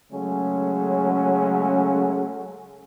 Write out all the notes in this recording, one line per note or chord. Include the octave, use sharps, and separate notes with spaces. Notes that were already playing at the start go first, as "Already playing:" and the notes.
C#3 F#3 G#3 A3 C#4